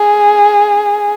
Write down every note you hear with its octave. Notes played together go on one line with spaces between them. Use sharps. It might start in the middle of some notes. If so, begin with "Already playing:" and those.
Already playing: G#4